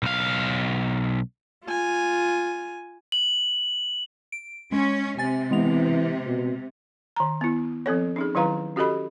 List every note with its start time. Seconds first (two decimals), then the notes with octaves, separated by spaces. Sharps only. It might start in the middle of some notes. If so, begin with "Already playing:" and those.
0.03 B1 F5
1.65 F4 G#5
3.12 F#7
4.32 D7
4.72 G#3 C#4
5.18 C3 G#5 A6
5.51 E3 G#3 B3 F7
6.26 B2
7.16 D#3 A#5
7.41 B3 E4
7.86 F3 C4 A4 C#5
8.16 C#4 D#4 G#4
8.35 D#3 F#3 E4 B4 F5 A#5
8.76 C#4 F#4 G4 A4 D#5 B5